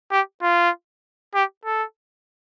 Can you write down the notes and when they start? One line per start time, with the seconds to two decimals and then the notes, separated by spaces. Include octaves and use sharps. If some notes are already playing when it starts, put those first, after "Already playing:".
0.12 G4
0.42 F4
1.34 G4
1.65 A4